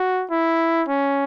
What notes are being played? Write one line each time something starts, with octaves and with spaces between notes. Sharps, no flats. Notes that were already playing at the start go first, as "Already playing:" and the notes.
Already playing: F#4
E4
C#4